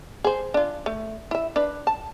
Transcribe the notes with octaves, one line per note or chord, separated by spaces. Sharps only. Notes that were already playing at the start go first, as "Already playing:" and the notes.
G#4 C5
D4 F4
A3
E4 E5
D4 B4
A5